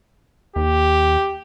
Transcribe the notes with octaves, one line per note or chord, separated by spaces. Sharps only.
D#2 G4